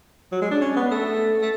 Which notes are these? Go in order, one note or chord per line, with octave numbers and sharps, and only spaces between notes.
F#3
G#3
D4
C#4
B3
A3
A3